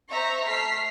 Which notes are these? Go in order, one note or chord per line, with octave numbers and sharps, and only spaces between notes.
C5 E5 A#5 C#6
A3 F6 B6 C7